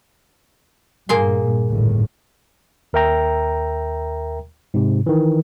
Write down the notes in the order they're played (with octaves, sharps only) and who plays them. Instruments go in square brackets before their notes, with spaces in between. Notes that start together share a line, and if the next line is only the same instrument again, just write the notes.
[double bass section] G2 A#2 [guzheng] A#3 G#4 C6
[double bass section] G1 D#2 A2
[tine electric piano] D#2 A#4 E5 G5 A#5
G#2 C3
D#3 E3